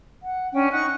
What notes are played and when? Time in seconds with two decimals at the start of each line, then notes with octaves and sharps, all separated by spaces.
0.24 F#5
0.54 C#4 D4 G5
0.72 D#4 F#5 C#6 F#6